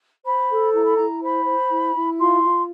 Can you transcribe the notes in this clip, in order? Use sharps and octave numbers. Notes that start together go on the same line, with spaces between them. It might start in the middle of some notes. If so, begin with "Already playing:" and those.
C5 B5
A4
E4 A#5
B5
E4 A#5
C5 B5
C5
E4
E4
F4 C6
F4